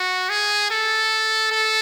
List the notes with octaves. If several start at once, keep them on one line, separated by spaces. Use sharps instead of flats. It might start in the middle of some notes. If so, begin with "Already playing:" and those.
Already playing: F#4
G#4
A4
A4